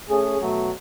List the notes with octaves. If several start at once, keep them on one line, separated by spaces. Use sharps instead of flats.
A3 C#4 G#4
B2 F#3 A3